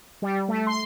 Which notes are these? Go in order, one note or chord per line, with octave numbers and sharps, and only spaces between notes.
G3
A3
C6